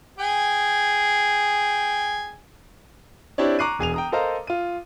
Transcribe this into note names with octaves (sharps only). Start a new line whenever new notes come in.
G#4 G5 G#5
C4 D4 E4 G4 C#5 D5
A#5 C#6 D6 F#6 C7 D#7
E1 G#4 D#7 F7
G5 A#5 D#6
A4 A#4 C5 D#5 F5 A#5
F4 D#7